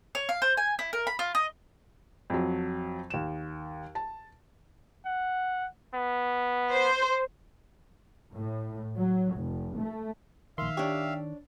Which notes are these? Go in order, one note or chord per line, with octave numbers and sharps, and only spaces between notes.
C#5
F5
C5
G#5
E4
A#4
B5
F4
D#5
F2 F#3
D#2 E7
A5
F#5
B3
C5
A2
F#3
F1
A3
A#1 D#3 E5 F5 C6
D4 G4 C#5